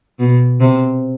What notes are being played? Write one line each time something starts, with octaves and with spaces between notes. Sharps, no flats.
B2
C3